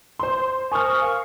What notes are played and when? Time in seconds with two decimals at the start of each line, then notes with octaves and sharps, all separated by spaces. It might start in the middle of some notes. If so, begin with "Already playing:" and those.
0.19 C5 C6
0.72 A#4 C5 G#5 C#6 D#6 F6
1.00 F5